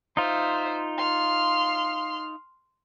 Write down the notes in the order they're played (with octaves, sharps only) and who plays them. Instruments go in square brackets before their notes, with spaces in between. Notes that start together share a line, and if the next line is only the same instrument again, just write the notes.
[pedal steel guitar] D#4 F4 [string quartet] C5 E5
[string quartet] C6 F6